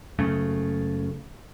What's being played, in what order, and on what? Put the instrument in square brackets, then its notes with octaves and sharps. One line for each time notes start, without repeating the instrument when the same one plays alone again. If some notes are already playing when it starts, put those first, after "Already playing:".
[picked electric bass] F#1 C#3 A3